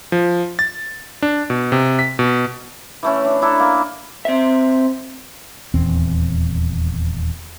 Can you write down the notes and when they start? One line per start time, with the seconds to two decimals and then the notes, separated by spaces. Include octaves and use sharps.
0.12 F3
0.59 A6
1.22 D4
1.50 B2
1.72 C3
1.99 B6
2.19 B2
3.03 E3 A3 C#4
3.25 D4
3.41 D4 E4 A4 A#5
3.60 A#3
4.25 C4 E5
5.74 D#1 E2 C4